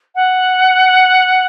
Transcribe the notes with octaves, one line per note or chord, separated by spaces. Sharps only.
F#5